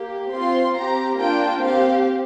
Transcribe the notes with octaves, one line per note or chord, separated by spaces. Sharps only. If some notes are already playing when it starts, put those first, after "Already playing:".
Already playing: A#3 G4
C4 F4 C6
C4 G4 A#5
A#3 D4 F4 G5
C4 G4 F5